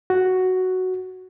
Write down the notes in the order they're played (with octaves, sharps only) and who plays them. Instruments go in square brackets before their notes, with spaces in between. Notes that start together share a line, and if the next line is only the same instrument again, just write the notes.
[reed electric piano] F#4